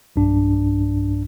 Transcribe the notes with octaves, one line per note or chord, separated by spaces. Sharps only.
B1 G2 D4